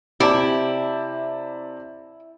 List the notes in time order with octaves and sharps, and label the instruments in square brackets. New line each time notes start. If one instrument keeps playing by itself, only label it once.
[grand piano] C3 D5 A5 [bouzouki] E4 [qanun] G4